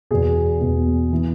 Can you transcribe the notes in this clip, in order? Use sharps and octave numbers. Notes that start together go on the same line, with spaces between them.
E2 B2 G#4
E2 B2
E3